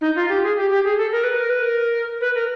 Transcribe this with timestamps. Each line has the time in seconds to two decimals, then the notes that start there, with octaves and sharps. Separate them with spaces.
0.01 D#4
0.16 F4
0.29 G4
0.43 G#4
0.57 G4
0.70 G4
0.84 G#4
0.98 A4
1.12 A#4
1.24 B4
1.37 A#4
1.50 B4
1.62 A#4
2.21 B4
2.35 A#4